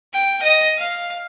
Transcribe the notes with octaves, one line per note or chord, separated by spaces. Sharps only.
G5
D#5
F5